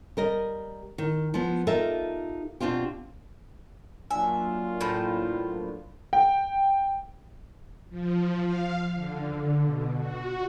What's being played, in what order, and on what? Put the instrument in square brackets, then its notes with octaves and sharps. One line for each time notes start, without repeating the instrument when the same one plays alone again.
[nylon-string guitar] G3 A#4 D#5
D#3
F3 B3
D#4 F4 G4 A4 A#4 E5
B2 C4 D4 F4 G4
[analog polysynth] F#3 A#3 D4 [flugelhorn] F4 [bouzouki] E5 [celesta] G#5
[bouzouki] A2 F3
[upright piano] G5
[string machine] F3
F5
D3
B2
F#4